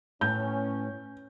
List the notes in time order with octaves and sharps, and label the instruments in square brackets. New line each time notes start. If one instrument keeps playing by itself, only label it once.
[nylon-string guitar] A2 B4 [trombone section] C#4 [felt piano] G6